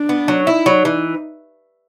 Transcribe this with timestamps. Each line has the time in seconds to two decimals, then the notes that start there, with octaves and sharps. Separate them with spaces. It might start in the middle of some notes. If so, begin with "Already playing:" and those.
Already playing: D4
0.09 B3
0.28 F#3
0.47 D#4 E4
0.66 F#3
0.85 E3